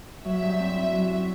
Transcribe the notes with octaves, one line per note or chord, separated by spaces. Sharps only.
F#3 E5
G2
C4
E4
F#3